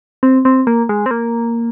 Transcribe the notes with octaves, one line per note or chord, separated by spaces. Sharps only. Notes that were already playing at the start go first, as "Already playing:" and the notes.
C4
C4
A#3
G#3
C4
A#3